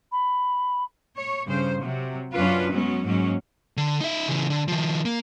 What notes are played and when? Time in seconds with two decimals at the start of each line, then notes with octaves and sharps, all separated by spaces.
0.12 B5
1.16 C#5
1.46 G2 C#3 C5
1.81 C3 F#3
2.33 F#2 F#3 C#4 D4 F4 B4
2.69 F#3 G#3 B3 C#4
3.04 G#2 F#3 G#3 A#3 C#4
3.77 D3
4.01 D#4 E5
4.28 C#3 E3
4.50 D3
4.68 D#3 F3
5.05 A#3